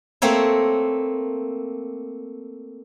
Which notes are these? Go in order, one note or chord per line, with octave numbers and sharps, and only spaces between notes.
A3 A#3 C4 C#5